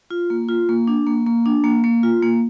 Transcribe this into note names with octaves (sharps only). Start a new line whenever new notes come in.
F4
A#3
F4
A#3
D4
A#3
A#3
D4
A#3
A#3
F4
A#3